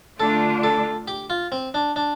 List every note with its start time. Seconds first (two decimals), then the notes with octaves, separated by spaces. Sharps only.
0.19 D3 A3 D4 F4 A4
0.63 A4
1.08 G4
1.30 F4
1.52 C4
1.74 D4
1.96 D4